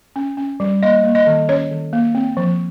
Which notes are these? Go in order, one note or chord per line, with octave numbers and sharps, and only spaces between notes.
C#4
C#4
G3
A#3 D#5
A#3
D#5
D#3
C#4 C#5
D#3
A#3
C4
F3